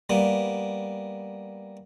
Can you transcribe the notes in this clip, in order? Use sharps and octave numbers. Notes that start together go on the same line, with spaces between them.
G3 A#3 B3